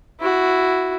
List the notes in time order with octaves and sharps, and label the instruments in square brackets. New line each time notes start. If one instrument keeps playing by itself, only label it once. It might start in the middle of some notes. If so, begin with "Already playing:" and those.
[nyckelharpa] E4 F#4